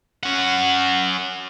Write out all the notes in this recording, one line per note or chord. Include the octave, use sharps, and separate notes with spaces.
C#4 F#5